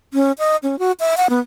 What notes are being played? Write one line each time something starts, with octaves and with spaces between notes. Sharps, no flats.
C#4
D#5
C#4
F#4
E5
F#5
B3